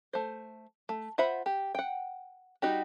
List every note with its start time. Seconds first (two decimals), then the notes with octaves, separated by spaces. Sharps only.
0.13 A3 C5
0.89 A3
1.18 F4 C5 E5 F#5 B5
1.46 G4
1.75 F#5 G5
2.62 G3 D#4 F#4 G4